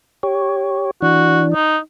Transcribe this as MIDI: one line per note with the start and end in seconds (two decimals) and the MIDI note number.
0.23 0.91 67
0.23 0.91 73
1.02 1.54 52
1.02 1.54 62
1.02 1.43 66
1.54 1.78 63